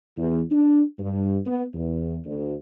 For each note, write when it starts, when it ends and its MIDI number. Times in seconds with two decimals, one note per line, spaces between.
0.17 0.41 40
0.51 0.82 62
0.99 1.39 43
1.46 1.64 59
1.74 2.19 40
2.25 2.55 38